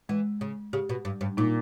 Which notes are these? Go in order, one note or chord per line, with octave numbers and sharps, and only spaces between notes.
E3 G#3
C#3
C#3 G4
B2
G2
G2
A#2 D#4